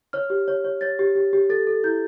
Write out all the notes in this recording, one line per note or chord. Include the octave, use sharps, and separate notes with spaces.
C#5 F6
G4
C#5
C#5
C#5 A6
G4
G4
G4
A4 A6
A4
E4 G6